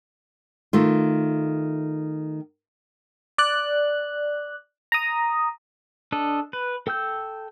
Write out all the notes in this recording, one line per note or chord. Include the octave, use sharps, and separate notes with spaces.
D#3 A3 F4
D5 F#6
A#5 D#6
D4 A4 D#5
B4
A4 G5 E6 G6